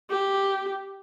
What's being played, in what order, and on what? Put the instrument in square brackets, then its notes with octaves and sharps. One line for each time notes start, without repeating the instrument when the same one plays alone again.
[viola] G4